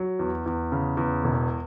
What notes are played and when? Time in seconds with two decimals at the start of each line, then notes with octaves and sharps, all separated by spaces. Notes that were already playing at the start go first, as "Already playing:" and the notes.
Already playing: F#3
0.19 E2
0.46 E2
0.72 C#3
0.97 E2
1.24 E1